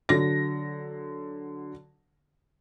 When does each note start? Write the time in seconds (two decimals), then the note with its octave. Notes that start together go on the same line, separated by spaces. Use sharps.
0.09 D3 F#3 A#6